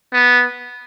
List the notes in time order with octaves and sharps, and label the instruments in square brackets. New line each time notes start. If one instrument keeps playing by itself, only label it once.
[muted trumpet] B3